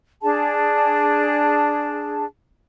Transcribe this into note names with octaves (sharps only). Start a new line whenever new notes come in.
D4 G#4 A5